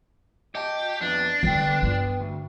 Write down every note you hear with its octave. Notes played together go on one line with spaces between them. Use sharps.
G4 D#5 A5
F2 B3 D4
D3 G3 B3 G5
G2 F4
D2